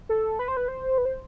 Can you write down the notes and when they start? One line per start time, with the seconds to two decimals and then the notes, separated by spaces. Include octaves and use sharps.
0.09 A4
0.39 B4
0.48 C5
0.57 B4
0.68 C5
0.98 B4
1.05 C5